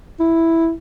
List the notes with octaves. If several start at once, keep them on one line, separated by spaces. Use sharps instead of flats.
E4